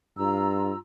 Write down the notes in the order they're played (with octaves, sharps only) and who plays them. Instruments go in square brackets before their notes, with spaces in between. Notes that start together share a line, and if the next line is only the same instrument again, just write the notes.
[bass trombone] G2 [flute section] F4 A#5 E6